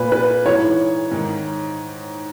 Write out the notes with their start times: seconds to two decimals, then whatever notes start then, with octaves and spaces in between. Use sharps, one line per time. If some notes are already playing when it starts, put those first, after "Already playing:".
Already playing: A#2 B4
0.12 B4
0.45 G#2 E3 C#5
1.11 G#2 D#3